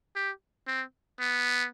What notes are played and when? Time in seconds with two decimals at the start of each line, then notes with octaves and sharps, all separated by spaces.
0.16 G4
0.67 C4
1.20 B3